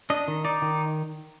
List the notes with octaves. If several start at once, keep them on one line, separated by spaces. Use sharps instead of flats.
D4 D#5
D#3
D#4 D5
D#3